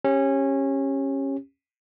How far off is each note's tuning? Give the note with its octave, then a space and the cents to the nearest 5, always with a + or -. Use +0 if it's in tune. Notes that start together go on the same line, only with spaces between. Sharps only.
C#4 -20 G4 +15